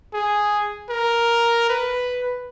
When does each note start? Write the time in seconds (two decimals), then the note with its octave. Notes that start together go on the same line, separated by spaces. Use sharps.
0.14 G#4
0.90 A#4
1.70 B4